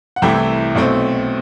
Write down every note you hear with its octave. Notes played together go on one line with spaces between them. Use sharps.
F#5
C2 C3 E3 A3 E4 G5
B1 B2 A3 C4